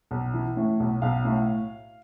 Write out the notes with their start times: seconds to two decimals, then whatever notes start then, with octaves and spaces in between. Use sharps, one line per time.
0.11 B1
0.34 E3
0.57 A2
0.80 B1
1.02 B1 F5
1.25 A2